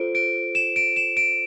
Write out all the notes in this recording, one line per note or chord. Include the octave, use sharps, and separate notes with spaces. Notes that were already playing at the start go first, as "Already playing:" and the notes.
Already playing: F4 A4 C5 D7
D7
E7
D7
E7
D7